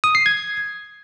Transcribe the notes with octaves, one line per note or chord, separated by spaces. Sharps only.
D#6
C7
G#6